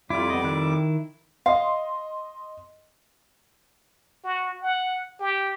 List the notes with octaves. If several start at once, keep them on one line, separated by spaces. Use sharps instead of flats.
F2 G3 E4 F4 D6
B3 D#5
D#3 E4 F#6
D#5 F5 C6
F#4
F#5
G4